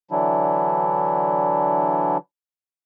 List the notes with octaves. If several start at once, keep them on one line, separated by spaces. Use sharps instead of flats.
D3 E3 F#3 D4 E4